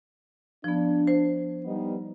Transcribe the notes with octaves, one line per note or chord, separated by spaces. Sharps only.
F3 B3 D4
C5
G3 B3 D#4